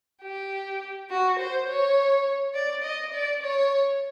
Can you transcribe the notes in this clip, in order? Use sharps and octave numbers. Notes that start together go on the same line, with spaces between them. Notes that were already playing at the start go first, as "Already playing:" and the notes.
G4
F#4
C5
C#5
D5
D#5
D5
C#5